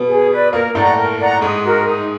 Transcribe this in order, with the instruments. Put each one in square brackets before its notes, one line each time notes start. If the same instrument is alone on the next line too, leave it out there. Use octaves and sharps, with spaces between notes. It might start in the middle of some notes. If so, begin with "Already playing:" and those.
Already playing: [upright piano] B2 B3
[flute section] G#4
B4 D5
[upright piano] A#2 A#3 [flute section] A#4
[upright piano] A2 A3 [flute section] D5 F#5 A#5
[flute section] A#4
D5 F#5 A#5
[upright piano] G#2 G#3 [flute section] D#4
[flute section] F#4 A#4
D#4